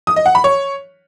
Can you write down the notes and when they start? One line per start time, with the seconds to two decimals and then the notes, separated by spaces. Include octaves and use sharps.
0.07 D#6
0.16 D#5
0.26 F#5
0.35 B5
0.44 C#5